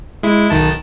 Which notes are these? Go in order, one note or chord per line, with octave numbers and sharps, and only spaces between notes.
G#3 E4
B1 D#3 A5